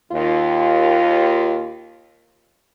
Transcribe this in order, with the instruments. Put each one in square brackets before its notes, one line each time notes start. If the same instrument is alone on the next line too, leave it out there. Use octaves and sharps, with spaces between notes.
[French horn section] D#2 F4